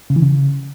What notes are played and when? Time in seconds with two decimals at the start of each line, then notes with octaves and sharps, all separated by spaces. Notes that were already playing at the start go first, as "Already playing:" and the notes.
0.10 C#3
0.16 E3
0.22 C#3